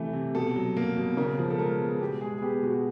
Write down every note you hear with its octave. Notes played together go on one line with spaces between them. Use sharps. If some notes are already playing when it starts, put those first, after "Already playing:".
Already playing: C3 E3 A3
C3
B2 A4
F#3
A#3
B2
C#3 A#4
F3
A4
G#3 A#4
B3
B2 G4
G#3 G#4
G#4
B3 G4
B2 F#4